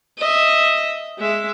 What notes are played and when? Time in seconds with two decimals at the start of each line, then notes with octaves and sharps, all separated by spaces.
0.18 D#5 E5
1.18 G#3 E5